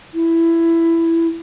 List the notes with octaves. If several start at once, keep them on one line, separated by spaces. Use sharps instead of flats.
E4